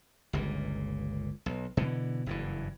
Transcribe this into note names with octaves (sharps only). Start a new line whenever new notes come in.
G1 C#2 A#2
B1
B2 D3 E3
F#1 G2 A#2 E3